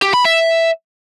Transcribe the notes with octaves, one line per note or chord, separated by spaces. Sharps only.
G4
B5
E5